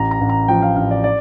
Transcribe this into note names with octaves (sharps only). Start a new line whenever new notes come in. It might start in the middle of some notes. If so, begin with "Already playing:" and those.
Already playing: A1 A#5
A#5
A1
A#5
F3 G5
F5
A1 F5
D5
D5